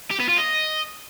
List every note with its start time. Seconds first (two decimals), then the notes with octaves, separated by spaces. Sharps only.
0.11 G4
0.20 B3
0.29 F4
0.38 D#5